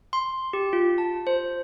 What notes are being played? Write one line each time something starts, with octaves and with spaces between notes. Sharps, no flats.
C6
G4
F4
A5
C5